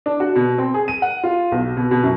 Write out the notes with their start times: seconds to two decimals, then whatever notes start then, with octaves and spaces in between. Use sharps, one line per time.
0.06 D4
0.20 F#4
0.36 B2
0.58 C4
0.74 G#4
0.88 D#7
1.02 F#5
1.24 F4
1.52 B1
1.77 B2
1.91 B2
2.03 F#2